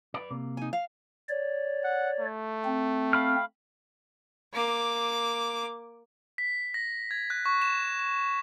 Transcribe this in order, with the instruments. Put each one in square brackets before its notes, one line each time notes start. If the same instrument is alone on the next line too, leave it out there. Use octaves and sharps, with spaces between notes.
[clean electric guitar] B4 D5
C3 A#3
[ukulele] D#4 G#5
F5
[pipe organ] C#5 D5
[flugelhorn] F#5
A3
[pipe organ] C4
[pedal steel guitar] F5 B5 F6
[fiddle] A#3 D6
[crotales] B6
A#6
G#6
F#6
C#6
E7
E7